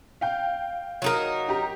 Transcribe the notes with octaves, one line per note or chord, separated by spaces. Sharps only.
F5 G5
F#3 D#4 A#4
G4 A#5